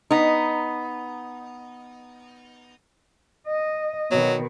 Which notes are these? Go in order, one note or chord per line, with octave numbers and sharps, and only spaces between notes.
B3 D#4
D#5
B2 D#3 F#3